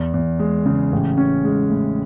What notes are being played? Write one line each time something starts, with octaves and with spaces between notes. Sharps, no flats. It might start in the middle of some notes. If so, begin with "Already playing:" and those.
Already playing: E2
E2
G#3
C#3
A1
C#4
G#3
A2